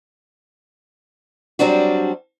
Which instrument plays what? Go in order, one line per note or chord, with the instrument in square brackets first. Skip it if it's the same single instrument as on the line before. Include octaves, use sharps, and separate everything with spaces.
[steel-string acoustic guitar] F#3 G3 C4 D4 F#4